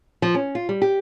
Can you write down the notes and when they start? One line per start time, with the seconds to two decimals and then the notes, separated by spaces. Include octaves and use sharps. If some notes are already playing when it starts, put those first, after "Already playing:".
0.22 F3
0.35 C#4
0.55 F4
0.69 G3
0.82 G4